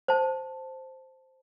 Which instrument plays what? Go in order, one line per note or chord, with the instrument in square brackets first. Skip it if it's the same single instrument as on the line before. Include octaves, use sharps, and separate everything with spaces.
[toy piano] C5 A5